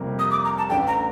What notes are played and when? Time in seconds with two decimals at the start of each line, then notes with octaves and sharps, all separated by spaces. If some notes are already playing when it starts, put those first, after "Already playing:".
Already playing: F1 F2 C3 G3 A#3
0.19 D#6
0.31 D6
0.45 A#5
0.58 A5
0.70 A1 A2 A3 D4 G5
0.87 A#5